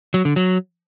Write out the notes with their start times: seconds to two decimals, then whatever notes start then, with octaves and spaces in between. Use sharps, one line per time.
0.14 F#3
0.25 D3
0.36 F#3